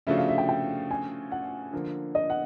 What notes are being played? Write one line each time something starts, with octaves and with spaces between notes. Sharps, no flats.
C#3 F3 A3 D4 F#4 E5
F5
E5
G5
G5
G#5
F#5
D3 F3 A#3
D#5
F#5